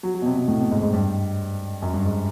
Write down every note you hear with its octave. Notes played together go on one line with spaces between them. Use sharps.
F#3
F#3
B2
C3
B2
A2
B2
G#2
G#2
G2
F#2
G2
G#2